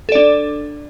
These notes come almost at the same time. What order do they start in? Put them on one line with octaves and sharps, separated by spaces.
A4 D5 D4